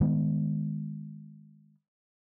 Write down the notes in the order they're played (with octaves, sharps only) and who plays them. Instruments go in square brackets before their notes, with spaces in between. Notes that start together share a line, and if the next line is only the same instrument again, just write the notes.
[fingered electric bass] D#3 G#3 B3